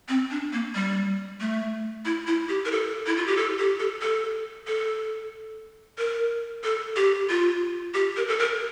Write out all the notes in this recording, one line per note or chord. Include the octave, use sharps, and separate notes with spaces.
C4
D4
A#3
G3
A3
E4
E4
G4
A#4
A4
E4
F4
G4
A4
G4
A4
A4
A4
A#4
A4
G4
F4
G4
A#4
A4
A#4